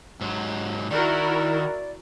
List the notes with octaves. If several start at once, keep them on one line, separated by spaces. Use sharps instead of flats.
G#2 F#3
D#3 E4 F#4 A#4 D5